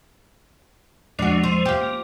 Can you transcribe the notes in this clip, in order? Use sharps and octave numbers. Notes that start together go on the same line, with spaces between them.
E2 F3 G#3 D4 F#4
C5
F4 G4
A#3